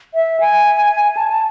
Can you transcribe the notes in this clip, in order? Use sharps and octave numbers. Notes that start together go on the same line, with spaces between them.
E5
G#5
A5